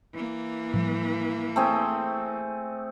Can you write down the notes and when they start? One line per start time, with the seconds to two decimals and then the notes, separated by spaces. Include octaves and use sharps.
0.13 E3 A#3
0.74 A2 F3 G3
1.56 A3 C4 G#4